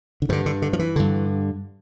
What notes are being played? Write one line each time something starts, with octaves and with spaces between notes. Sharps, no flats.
D3
G2 D3 E3
D3
D3
F3
E3
G2 D3